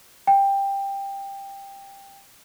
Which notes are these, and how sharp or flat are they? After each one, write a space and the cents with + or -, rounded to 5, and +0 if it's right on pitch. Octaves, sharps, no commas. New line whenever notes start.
G5 +15